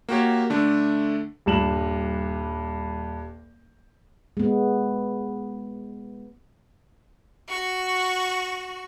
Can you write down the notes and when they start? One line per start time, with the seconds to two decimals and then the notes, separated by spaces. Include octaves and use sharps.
0.09 A#3 F#4 G4 C#5
0.50 D3 A3 D4
1.46 D#1 G2 E7 F#7
4.37 G#3 B3
7.48 F#4 C#6